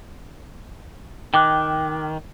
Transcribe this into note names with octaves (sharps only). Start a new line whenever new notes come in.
D#3 G5 D6 F#6